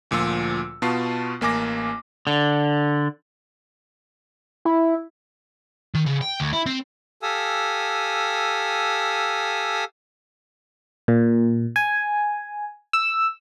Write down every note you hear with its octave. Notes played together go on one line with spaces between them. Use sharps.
D2 A#2 F3 F4 E6
B2 B3 F4 A5 C#6 C7
A1 A#3 G#5 D6 A#6
D3
E4
D#3
C#3
G5
D2
E4
C4
G4 A4 F5 G#5 D#6 E6
A#2
G#5
E6